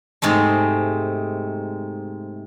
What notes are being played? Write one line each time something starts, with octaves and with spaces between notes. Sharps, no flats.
G#2 C3 G#3 A3